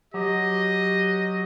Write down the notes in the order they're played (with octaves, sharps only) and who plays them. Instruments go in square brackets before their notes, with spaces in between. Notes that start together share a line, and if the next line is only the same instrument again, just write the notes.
[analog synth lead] F#3 [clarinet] G4 [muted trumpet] D#5